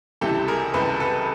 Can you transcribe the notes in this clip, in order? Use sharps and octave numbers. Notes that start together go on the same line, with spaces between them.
C#2 C3 E3 G4 A4
G#4 A#4
C#2 C3 E3 A4 B4
A4 B4